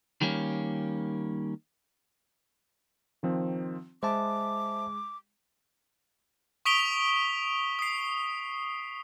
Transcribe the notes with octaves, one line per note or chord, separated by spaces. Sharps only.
D#3 G3 A#3 C#4
D#3 F3 C4
G#3 C5 E5 A5 D6
C#6 D#6 B6 D7 F7 G7
D#6 C7